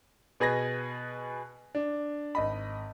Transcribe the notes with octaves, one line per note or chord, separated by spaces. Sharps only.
B2 G#4 B4 G#6 A#6
D4
G#1 D#5 B5